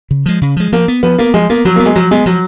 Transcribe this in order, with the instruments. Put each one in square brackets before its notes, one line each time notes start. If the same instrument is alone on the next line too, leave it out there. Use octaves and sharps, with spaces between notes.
[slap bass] C#3
F3 G#3
C#3
F3 G#3
[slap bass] F3 [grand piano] A#3
[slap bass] B3
[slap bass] F3 [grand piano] B3
[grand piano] A#3 [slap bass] B3
[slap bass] F3 [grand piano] G#3
[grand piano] A#3 [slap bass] B3
[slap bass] F3 [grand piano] F#3
[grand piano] A#3 [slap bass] B3
[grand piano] G#3
[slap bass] F3 [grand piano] F#3
[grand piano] G#3 [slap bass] B3
[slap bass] F3 [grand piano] F#3